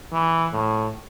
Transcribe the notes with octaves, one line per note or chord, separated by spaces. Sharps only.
E3
A2